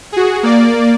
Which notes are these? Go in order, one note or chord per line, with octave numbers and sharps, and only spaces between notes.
F#4 G#4
A#3 D5